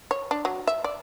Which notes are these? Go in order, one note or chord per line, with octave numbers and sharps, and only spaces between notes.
C#5
D4
F#3
E5
D5